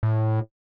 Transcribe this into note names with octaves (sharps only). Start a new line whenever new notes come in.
A2